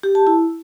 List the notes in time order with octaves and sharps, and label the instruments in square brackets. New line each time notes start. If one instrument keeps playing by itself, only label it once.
[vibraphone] G4
A5
E4